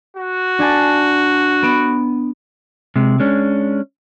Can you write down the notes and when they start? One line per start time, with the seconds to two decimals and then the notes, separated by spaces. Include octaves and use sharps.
0.17 F#4
0.59 D4 G#5 A5
1.63 B3 D7 E7
2.96 C3 G#3
3.20 G#3 C#4 D4